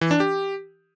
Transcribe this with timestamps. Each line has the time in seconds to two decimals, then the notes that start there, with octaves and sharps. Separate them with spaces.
0.01 E3
0.11 D4
0.20 G4